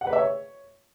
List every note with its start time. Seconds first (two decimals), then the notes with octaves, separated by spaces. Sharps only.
0.01 F#5
0.07 B4
0.13 E5
0.19 C#5